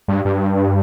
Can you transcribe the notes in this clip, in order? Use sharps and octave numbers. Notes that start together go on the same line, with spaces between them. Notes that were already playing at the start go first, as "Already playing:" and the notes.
G2
G2